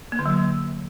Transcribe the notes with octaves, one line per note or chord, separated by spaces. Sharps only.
A#3
D3
F#3